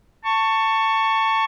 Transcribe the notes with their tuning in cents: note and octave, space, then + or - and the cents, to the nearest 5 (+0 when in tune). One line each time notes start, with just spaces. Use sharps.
A5 +20 C#6 +0